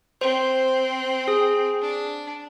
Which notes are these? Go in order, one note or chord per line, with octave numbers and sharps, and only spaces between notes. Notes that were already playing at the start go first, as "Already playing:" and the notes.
C4 C5
G#4
D4